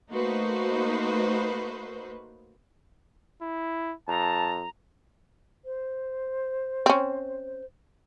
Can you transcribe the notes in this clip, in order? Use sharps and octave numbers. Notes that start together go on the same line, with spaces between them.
A3 A#3 D#4 F#4 B4 C5
E4
F2 A5 A#5
C5
C4 C#4